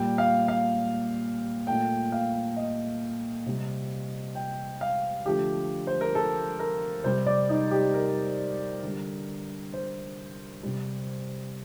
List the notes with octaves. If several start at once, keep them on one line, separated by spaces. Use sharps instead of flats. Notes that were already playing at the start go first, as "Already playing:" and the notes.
Already playing: A#2 G3 G5
F5
F5
A#2 A3 G5
F5
D#5
C3 G3
G5
F5
D3 F3 A3 G4
C5
A#4
A4
A#4
C3 G3 C5
D5
D#4
G4
A#4
D3 G3
C5
C3 G3